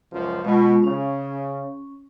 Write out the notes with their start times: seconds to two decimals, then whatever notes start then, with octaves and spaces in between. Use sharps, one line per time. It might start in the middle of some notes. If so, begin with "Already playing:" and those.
0.11 C#2 F#2 F3
0.44 B2 G#3 F4
0.84 C#3 C#4